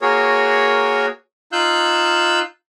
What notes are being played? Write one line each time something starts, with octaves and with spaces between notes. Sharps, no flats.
A#3 F#4 G#4 A#4 C#5
D#4 F4 F5 E6 F#6 G6